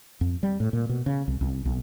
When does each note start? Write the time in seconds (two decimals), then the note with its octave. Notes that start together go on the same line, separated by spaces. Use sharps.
0.21 F2
0.43 G3
0.60 A2
0.73 A#2
0.89 B2
1.06 C#3
1.28 C2
1.41 C2
1.65 B1